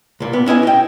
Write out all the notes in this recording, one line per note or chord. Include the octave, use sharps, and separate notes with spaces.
C2 A#2
B3
C#4 E4 D#5 G#5
D#5 G5